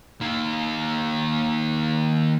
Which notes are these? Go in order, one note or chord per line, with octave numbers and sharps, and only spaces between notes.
D#3 A#3